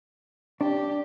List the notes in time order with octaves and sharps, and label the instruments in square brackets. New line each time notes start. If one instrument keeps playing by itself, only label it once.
[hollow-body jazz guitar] D4 [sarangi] G4